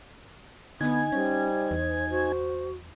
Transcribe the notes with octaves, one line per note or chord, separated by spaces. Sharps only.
D3 B3 D#4 G#5
G3 C#4 C5
E2
F#4 C5